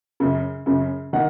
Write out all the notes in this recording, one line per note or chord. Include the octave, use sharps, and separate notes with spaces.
F#2 C#3
F#2 C#3
D#3 F#5